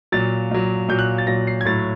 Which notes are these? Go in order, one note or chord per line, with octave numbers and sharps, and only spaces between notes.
A#2 F#3 A6
A#2 F#3
A#2 F#3 G6
F#6
A6
A#2 F#3 A#6
C7
G#6
A2 F#3 A6